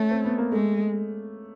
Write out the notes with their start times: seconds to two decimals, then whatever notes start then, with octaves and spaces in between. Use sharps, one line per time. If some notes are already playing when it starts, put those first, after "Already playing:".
Already playing: A3 C#4
0.11 C4
0.25 B3
0.38 A#3
0.52 G#3 A3